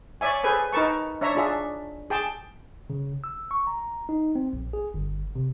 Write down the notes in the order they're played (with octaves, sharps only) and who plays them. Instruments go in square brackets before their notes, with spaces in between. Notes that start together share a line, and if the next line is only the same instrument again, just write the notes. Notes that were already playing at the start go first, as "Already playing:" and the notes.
[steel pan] C#5 D5 E5 G#5
G#4 A4 B4 C5 G#5
D#4 A#4 B4 A5 C#6
D4 C#5 E5 A#5
D4 F4 G#4 E5
G#4 G5 A5
[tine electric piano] C#3
E6
C#6
A#5
D#4
C4
A#1
G#4
G1
C3